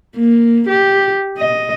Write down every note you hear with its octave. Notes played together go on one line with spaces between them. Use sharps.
A#3
G4
D#5